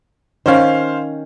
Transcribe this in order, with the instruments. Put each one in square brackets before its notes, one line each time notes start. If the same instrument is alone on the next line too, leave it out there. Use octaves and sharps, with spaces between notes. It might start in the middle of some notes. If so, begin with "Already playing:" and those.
[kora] D#3 C#4 [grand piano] C5 F5